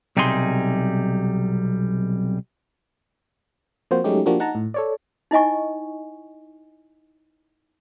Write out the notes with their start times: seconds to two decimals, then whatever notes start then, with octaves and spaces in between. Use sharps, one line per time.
0.17 B1 C3 G3 D#4 G#4 C6
3.91 F3 A#3 C4 F#4 C5
4.04 F#3 G#3 A3 C#4 D#4 G4
4.26 F3 A#3 D4 F#4 G4
4.40 D#4 F#5 A5 A#5
4.55 A2
4.74 A4 C#5 D5
5.31 D#4 E4 D#5 G#5 C#6